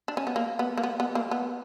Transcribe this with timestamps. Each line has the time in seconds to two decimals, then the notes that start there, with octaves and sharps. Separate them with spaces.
0.08 D4
0.17 C#4
0.27 B3
0.36 A#3
0.59 B3
0.78 A#3
0.83 B3
1.00 B3
1.15 A#3
1.31 B3